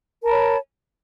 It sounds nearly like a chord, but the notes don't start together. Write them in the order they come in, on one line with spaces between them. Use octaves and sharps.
A#4 A5 B5 C#5